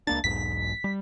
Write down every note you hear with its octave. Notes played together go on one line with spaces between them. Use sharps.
C#2 A#3 D4 A6
B1 E2 G#2 B6
G3